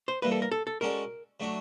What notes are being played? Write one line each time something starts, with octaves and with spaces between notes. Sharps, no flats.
C5
E3 G3 A#3 B4
A4
A#4
A4
A4
G#3 C#4 F#4 A4 A#4 D5
F#3 A3 D4 F#4